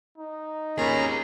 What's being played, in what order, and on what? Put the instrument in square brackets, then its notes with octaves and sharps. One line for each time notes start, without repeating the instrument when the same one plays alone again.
[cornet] D#4
[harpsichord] D#2 F4 [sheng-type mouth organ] C#4 A#5 [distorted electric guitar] G#4 B4